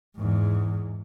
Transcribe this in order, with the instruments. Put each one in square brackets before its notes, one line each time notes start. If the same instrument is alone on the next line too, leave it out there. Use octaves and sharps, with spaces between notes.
[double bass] E2 G#2